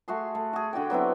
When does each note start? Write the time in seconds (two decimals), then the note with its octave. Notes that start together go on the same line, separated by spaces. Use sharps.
0.08 A3 F#4 G#4 C6
0.35 A3
0.53 F#4 G#4
0.73 D3 F#4 D5 G5
0.90 F#3 B3 C4 E4